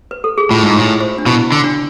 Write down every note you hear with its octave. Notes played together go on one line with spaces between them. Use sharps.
B4
A4
G#4
A2 F4
G#2
A2
C5
D4
B2 E4
D3
D4